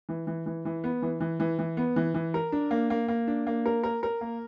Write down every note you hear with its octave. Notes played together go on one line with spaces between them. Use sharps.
E3
E3
E3
E3
B3
E3
E3
E3
E3
B3
E3
E3
A#4
D4
A#3
A#3
A#3
D4
A#3
A#4
A#4
A#4
A#3